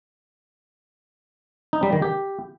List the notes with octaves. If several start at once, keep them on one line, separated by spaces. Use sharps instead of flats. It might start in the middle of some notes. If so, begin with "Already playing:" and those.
D#4
G3
D#3
G4